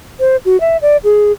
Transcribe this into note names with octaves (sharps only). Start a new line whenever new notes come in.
C5
F#4
E5
D5
G#4